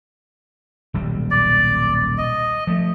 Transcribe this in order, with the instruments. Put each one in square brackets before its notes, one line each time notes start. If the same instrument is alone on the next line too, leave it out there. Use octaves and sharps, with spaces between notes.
[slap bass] D#1 B1 G3
[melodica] D5
D#5
[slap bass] F3 A3